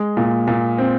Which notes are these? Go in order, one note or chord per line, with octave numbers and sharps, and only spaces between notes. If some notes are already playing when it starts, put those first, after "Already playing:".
Already playing: G#3
A#2
A#2
C4